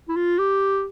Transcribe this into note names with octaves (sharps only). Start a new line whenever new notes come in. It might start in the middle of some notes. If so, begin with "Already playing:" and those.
E4
F4
G4